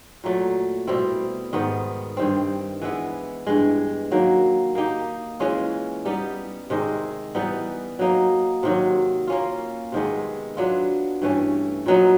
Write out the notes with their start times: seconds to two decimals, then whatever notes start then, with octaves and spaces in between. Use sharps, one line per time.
0.24 A#2 F#3 A3
0.87 B2 G3 C4 E4
1.53 G#2 D#3 G3 B3
2.17 G2 D#3 G3 C4
2.82 E3 G#3 B3 E4
3.47 G2 E3 G#3
4.11 D#3 F#3 A#3
4.75 A#3 D#4 G4
5.40 E3 G#3 C#4 F4
6.05 G3 B3 D#4 G4
6.70 C3 D#3 G#3
7.35 E3 G3 B3 D#4
7.99 F#3 A#3 D#4
8.63 C3 D#3 F#3
9.27 A#3 C#4 F4
9.92 C3 D#3 G#3 B3
10.57 F#3 B3 D4 F4
11.22 G2 E3 A3 C#4
11.86 A#2 F#3 B3 D#4